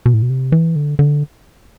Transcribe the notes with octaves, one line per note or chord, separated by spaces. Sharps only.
B2
A2
B2
C3
E3
D3
D3